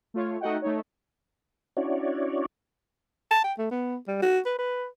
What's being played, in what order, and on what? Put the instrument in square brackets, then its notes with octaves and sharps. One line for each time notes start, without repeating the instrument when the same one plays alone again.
[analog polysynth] A3 F4 C#5
A3 D#4 F#4 D#5 F#5 G5
A3 D#4 C#5
[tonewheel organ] C#4 D4 E4 F#4 C#5 D5
[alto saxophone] A5
G5
A3
B3
G3
F#4
B4
B4